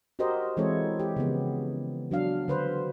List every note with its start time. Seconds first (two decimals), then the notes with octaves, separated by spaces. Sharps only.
0.19 F#4 G4 A#4 C5 D#5
0.57 E3 G#3 C4 E4 A4 C#5
1.00 G4
1.16 C#3 F3 B3
2.11 F#3 D4 F5
2.48 D3 B4 C5